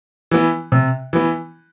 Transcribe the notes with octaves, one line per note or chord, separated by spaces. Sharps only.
E3 B3
C3
E3 B3